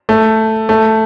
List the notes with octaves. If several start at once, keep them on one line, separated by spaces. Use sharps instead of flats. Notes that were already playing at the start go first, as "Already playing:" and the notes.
A3
A3